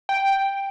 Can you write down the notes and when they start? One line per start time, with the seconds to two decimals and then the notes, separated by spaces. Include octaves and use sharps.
0.09 G5